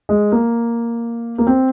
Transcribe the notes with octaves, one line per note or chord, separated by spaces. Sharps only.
G#3
A#3
A#3
C4